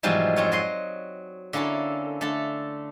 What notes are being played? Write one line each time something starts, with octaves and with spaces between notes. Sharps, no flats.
G#2 B2 E3 F3 G3 G#3
F2 F4 C#5
F#3 D#5 C6
D3 A#3 C#4 E4 A4
D3 A3 A4